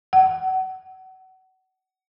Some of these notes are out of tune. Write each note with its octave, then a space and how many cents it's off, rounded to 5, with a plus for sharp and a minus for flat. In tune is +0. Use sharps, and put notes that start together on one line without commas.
F#5 +30